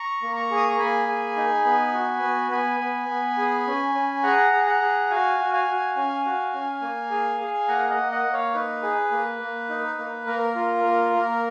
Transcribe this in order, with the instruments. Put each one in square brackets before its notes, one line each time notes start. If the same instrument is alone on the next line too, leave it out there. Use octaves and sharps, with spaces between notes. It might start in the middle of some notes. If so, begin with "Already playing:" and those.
Already playing: [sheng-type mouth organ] A#5 C#6
A#3
A#5 C#6
G#4
D#6
C#6
A#3 G#5 B5
G#4
D#4
B3
F#4
B3
B3 G#5 B5
B3
B3
G#4
C#4
C#4
G#4 F#5 A#5
G#4
F#5 A#5
G#4
F#4 F5 G#5
F#4
F5 G#5
F#4
C#4
F#4
C#4
A#3
G#4
G#4
A#3 F#5 A#5
F5
D#5 F#5
A#3
D#5 F#5
A#3
C#5 F5
D#4 B4
G#4
A#3
A#3
D#4
A#3
A#3 A#4
F4
A#3
A#3